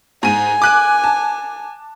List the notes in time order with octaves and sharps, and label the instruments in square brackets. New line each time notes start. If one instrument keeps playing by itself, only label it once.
[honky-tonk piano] G#2 D#7 [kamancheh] G#5
[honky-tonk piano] D6 F#6 D#7
A5